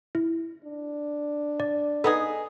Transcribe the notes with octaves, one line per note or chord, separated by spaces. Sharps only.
E4
D4
D5
B3 D#4 G#4 A4